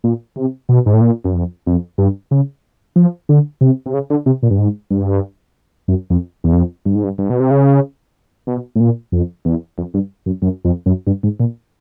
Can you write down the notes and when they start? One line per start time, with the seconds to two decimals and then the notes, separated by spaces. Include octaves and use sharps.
0.04 A#2
0.36 C3
0.69 B2
0.86 G#2
0.94 A2
1.01 A#2
1.24 F#2
1.34 F2
1.67 F2
1.98 G2
2.31 C#3
2.96 F3
3.29 D3
3.61 C3
3.86 C3
3.94 C#3
4.10 D3
4.26 C3
4.43 A#2
4.51 G2
4.58 G#2
4.90 G2
5.88 F#2
6.10 F2
6.44 E2
6.53 F2
6.85 G2
6.95 G#2
7.04 G2
7.18 G2
7.30 B2
7.40 C3
7.51 C#3
8.47 B2
8.76 A2
8.80 A#2
9.12 F2
9.45 E2
9.78 F2
9.94 G2
10.26 F#2
10.42 F#2
10.65 F2
10.86 F#2
11.07 G2
11.23 G#2
11.40 A#2